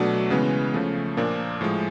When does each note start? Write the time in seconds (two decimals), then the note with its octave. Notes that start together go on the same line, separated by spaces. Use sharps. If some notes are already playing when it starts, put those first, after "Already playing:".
Already playing: B2 F#3 A3 D4
0.30 C#3 E3 G#3 B3
0.74 C#3 F3 A3
1.17 A#2 F3 A#3 D4
1.61 A2 F3 G#3